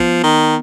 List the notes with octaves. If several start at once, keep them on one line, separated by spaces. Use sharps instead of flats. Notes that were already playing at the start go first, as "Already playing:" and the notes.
Already playing: F3 B3
D#3